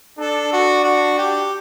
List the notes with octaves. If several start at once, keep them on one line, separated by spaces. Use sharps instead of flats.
D4 A4
F#4
F#4
G4